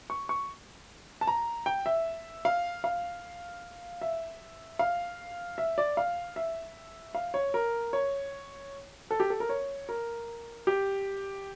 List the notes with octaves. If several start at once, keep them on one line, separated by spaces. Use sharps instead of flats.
C#6
C#6
A5
A#5
G5
E5
F5
F5
E5
F5
E5
D5
F5
E5
F5
C#5
A#4
C#5
A4
G4
A4
A#4
C#5
A#4
G4